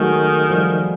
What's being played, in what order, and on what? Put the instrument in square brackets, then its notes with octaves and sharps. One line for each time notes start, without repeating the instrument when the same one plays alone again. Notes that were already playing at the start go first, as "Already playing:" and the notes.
Already playing: [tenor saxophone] D#3 [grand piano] F#3 G#3 A3
[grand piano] F3 G3